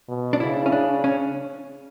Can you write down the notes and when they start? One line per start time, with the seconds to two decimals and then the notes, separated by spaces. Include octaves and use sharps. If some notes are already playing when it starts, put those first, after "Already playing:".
0.08 B2
0.33 D4
0.40 C#3 E4
0.66 C#4
0.72 D4
1.04 C#4